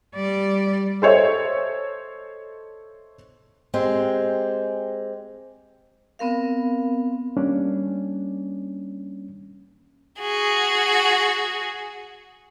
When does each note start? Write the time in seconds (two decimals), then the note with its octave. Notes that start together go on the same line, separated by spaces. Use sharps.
0.15 G3 D5
1.02 A4 C5 C#5 D#5 E5
3.74 G#3 C4 G4
6.19 B3 C4 A#4 F5
7.37 G3 A#3 C#4 D4
10.19 F#4 G#4